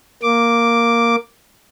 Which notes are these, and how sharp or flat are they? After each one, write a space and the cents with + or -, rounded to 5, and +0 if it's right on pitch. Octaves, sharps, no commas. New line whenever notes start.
A#3 +0 D6 +0